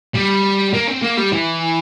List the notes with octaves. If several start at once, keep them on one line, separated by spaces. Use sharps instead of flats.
G3
A#3
C4
A#3
G3
E3